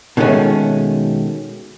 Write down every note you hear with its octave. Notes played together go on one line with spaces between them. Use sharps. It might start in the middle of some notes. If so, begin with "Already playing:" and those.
B2 D#3 G#3 A3 C#4